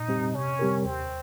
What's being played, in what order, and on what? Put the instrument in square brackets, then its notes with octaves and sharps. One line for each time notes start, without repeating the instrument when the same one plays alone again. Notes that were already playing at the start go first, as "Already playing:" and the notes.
Already playing: [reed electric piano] A#2 [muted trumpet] D#4
[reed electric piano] G3 C4 G4
[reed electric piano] C3 [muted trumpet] C#4
[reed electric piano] G3 C4 G4 A#4
[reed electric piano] D#2 [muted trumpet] C4